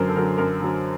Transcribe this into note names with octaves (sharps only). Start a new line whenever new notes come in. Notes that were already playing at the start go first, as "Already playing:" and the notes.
Already playing: F#2 D3 F#3 A#4 C5
A4
D3 F#3 A#4
F#2 A#4
D3 F#3